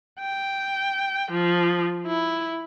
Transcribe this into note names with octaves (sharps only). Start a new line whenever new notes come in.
G5
F3
E4